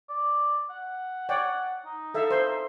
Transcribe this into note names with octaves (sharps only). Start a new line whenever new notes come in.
D5
F#5
C#5 D5 F#5 G5
D#4
A4 E5 F5
C5 E5